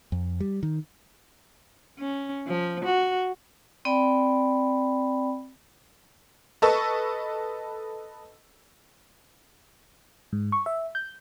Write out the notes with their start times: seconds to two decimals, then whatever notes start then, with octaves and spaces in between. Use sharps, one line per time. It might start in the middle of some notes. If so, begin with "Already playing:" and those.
0.12 F2
0.40 G3
0.63 D#3
1.99 C#4
2.47 F3
2.85 F#4
3.85 C4 D5 G5 B5
6.62 A4 B4 D#5 A5 C#6 E6
10.33 G#2
10.52 C#6
10.66 E5
10.95 G6